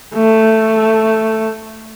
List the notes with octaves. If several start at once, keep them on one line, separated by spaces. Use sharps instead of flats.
A3